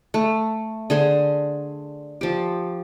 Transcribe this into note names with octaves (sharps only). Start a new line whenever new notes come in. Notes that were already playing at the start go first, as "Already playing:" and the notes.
A3
D3 G#4 C5
F3 G4